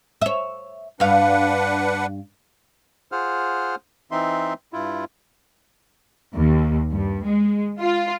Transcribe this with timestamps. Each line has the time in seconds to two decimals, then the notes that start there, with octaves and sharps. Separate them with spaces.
0.22 C#5 E5
1.00 G2 D4 B4 F5 F#5
3.12 F4 G#4 C5 F#5 F6
4.11 E3 C4 D#4 E5 C6
4.73 G2 E4 F4
6.36 D#2
6.92 G2
7.27 G#3
7.82 F4